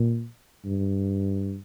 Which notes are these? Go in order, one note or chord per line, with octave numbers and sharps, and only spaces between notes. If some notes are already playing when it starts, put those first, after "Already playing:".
Already playing: A#2
G2